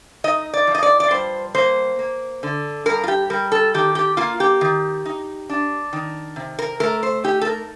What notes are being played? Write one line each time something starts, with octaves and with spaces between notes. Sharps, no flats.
D#4 D#5
D5
F3
D#5
D5
D5
G2 C5
A#3 C5
A#3
D3
G2 A#4
F4
G4
G3 A#4
A4
D#3 G4
G4
A#3 F4
G4
D#3
D#4
D4
D#3
C3
A#4
A3 A#4
C5
D#4 G4
A4
A#4